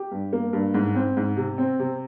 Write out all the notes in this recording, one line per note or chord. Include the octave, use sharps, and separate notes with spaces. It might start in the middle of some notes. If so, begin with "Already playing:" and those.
Already playing: G4
G2
A#3
G2
G#2
C4
G#2
C3
C4
C3